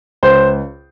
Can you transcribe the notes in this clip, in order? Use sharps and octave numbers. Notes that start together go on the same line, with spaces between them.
C#2 C5